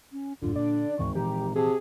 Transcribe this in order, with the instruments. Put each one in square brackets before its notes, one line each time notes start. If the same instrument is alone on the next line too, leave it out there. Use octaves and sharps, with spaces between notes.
[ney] C#4
[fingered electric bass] D1 F#2 A2 [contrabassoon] D3 [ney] F4
[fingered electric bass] A#2 [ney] D4 [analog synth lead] D5
[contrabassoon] G#1 [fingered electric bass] D2 G#2 E3 [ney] C#6
[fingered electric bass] A#2 E3 F3 [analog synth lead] G4 [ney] A#5
[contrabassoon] C3 [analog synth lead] G#4 [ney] A5